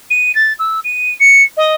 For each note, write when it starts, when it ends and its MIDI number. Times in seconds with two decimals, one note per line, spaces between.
0.10 0.34 99
0.35 0.53 93
0.59 0.80 88
0.84 1.14 99
1.19 1.42 97
1.56 1.75 75